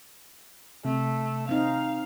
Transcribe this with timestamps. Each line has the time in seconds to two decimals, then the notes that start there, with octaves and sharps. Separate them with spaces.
0.85 C3 A3
1.49 C4 D#4 F5